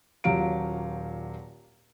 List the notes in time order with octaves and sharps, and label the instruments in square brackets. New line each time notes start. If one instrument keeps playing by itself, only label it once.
[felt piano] D#1 A#2 F#3 G4 F5 D7